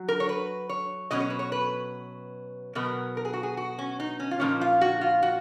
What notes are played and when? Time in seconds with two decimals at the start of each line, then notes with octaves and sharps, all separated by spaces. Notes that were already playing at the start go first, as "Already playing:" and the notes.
Already playing: F#3
0.09 A#4
0.20 C#5
0.29 B4
0.69 C#5
1.11 B2 F#3 C#4 D#5
1.20 C#5
1.30 B4
1.39 C#5
1.52 B4
2.75 B2 F#3 B3 A#4
3.17 A#4
3.25 G#4
3.33 F#4
3.43 G#4
3.57 F#4
3.79 C#4
4.00 D#4
4.20 C#4
4.31 F4
4.40 A#2 F3 A#3 C#4 D#4
4.61 F4
4.81 F#4
5.01 F4
5.23 F#4